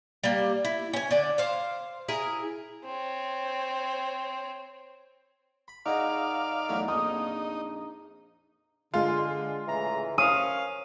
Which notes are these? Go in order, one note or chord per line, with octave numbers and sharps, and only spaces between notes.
G3 A#3
E4
C#4 G#5
D3 D5
C5 F5
E4 G#4 A#4
C4 C#5
B5
D#4 F#4 G#4 D5 F5
E2 F#3 A3
A#1 F2 D#4 D#6
D3 G#3 F4
A2 C#3 E3 A#5
C#4 A#4 C5 F5 D#6